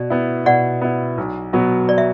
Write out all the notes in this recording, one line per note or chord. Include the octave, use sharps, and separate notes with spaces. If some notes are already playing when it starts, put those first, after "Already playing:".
Already playing: B2 D5
B3 E4
B2 D5 F#5
B3 E4
B1
B2 F#3 B3 F#4
D5
E5